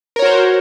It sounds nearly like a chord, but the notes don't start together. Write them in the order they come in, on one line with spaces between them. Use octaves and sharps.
A#4 C#5 F#4 C5